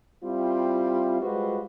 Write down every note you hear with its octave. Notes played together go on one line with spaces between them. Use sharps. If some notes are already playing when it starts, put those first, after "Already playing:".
G3 C4 E4 F4
G3 G#3 F4 F#4 B4 C5